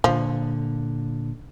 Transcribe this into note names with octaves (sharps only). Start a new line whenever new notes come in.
A#2 D3 F3